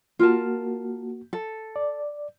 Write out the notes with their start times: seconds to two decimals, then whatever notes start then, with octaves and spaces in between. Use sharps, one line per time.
0.19 A#3 F4 F#4 A#4 A5
1.33 A4
1.76 D5